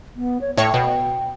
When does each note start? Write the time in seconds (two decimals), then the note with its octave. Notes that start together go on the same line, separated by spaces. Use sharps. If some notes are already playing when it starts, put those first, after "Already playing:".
0.16 B3
0.41 C#5
0.57 A2 C#5 G5
0.74 B2